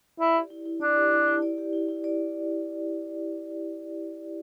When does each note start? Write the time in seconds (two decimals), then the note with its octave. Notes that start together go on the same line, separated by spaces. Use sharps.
0.19 E4 D5
0.35 G4
0.50 E4
0.65 E4
0.81 D4 D5
0.96 G4
1.11 E4
1.27 E4
1.42 D5
1.58 G4
1.73 E4
1.88 E4
2.04 D5